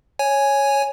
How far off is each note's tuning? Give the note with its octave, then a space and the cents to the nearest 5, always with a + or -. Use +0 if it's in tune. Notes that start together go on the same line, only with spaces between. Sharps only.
C#5 +0 G#5 +0